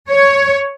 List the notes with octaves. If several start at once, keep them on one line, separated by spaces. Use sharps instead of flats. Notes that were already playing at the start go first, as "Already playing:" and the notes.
C#5